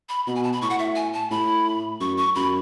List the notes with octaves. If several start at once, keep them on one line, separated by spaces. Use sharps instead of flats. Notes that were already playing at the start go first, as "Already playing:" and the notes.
B5
B2 B5
G#5
A5
B5
A2 C#6
F#5
E5
G#5
A5
A2 B5
F#2 C#6
C#6
F#2 B5